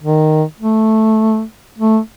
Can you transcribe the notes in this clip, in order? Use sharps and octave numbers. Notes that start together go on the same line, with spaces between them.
D#3
A3
A3